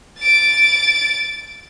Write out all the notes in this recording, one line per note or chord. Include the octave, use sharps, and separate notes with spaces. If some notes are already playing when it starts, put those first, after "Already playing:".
A6 D7